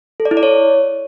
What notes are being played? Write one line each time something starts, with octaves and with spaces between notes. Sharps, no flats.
A4
D5
E4
D5
C#5